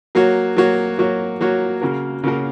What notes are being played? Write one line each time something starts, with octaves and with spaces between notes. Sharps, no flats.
F#3 A#3 F#4 C#5
F#3 A#3 F#4 C#5
F#3 A#3 F#4 C#5
F#3 A#3 F#4 C#5
C#3 A#3 F#4 A#4
C#3 A#3 F#4 A#4